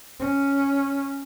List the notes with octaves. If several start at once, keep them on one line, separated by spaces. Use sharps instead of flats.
C#4